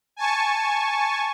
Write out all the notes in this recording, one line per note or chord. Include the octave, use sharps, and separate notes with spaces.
G#5 A5 C#6